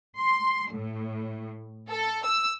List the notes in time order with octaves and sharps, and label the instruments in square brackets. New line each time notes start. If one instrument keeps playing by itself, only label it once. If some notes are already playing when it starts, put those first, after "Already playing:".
[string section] C6
A2
A4
E6